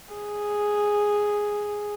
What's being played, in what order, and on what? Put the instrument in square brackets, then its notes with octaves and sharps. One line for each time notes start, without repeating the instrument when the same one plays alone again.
[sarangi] G#4